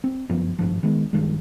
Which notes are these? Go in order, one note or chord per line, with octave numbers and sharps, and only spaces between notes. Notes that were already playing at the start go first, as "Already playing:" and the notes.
C4
G1 F#2 F3 B3
G#1 C#2 G2 F3
D#3 G#3 B3
A#1 G2 D#3 G#3